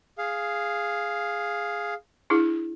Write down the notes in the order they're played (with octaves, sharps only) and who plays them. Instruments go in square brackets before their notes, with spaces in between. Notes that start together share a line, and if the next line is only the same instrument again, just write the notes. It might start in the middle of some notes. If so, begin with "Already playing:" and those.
[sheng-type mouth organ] G#4 F5
[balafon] D4 E4 G#4